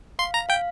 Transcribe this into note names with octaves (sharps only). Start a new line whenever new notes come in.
F5 C6
A#5
F5 G5